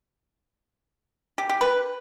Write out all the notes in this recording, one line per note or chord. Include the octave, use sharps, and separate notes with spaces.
G4
G4
B4